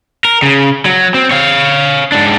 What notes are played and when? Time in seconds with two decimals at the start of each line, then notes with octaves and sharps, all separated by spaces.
0.25 A#4
0.42 C#3
0.85 F#3
1.14 C4
1.31 C#5 F5
2.12 G#2 D4